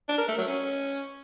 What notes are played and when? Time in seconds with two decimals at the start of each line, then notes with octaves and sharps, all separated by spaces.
0.09 D4
0.18 A#4
0.28 A3
0.38 F#3
0.48 C#4